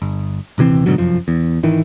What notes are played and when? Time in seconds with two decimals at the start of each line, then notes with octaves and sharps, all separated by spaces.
0.02 G1
0.58 D#1 C3 E3 C4
0.86 G#2 B2 D3 F#3
0.98 F1 F#2 F3
1.28 E2
1.63 G#1 D#3 E3